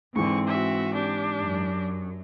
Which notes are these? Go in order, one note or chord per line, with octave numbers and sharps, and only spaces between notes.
G#2 D3 E3 C4 C#6
F#4 E5
D4 G4
F#2 F#3